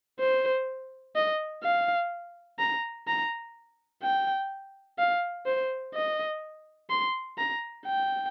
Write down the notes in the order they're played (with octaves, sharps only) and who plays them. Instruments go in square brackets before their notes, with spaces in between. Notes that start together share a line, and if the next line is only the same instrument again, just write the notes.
[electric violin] C5
D#5
F5
A#5
A#5
G5
F5
C5
D#5
C6
A#5
G5